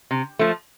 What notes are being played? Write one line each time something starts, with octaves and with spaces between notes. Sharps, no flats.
C3
F3 A3